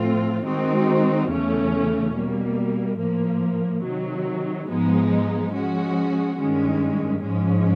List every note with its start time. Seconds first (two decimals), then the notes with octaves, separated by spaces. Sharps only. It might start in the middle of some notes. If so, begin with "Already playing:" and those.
Already playing: A2 F3 A3 C4 F4
0.45 D#3 G#3 C4 D#4 F#4
1.29 E2 C#3 E3 A3 C#4
2.15 B2 G3 A#3
2.99 A2 F3 A#3
3.84 C3 D#3 F#3
4.69 G#2 F3 G#3 B3 D#4
5.54 F3 G#3 C#4 F#4
6.38 G2 D#3 G#3 C#4
7.24 G#2 F3 G#3 C#4